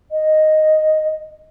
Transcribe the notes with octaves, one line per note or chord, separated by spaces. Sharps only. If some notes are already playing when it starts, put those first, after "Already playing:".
D#5